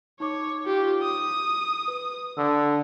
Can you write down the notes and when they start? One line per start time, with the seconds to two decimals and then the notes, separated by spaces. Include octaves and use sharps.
0.20 D#4 C#5 C#6 D6
0.66 F4 G4
1.02 D#6
1.88 B4
2.37 D3 E6